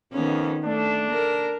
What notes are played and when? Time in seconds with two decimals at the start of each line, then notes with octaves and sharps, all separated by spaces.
0.13 F2 D#3 B3 C#4
0.65 A3 D4
1.10 A#4